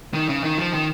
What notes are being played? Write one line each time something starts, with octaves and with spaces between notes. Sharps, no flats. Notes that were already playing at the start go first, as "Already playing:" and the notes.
D#3
C#3
D#3
F3
D#3